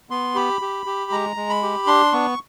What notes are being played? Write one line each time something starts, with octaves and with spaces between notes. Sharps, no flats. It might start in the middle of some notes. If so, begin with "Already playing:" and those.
B3 C6
G4 B5
G4
G4
G#3 A#5
G#3
B5
G4
D4 C6
B3 C#6